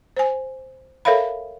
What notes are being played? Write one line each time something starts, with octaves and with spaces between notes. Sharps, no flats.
C5 G#5
A4 A#4 C#5 E5 F5 B5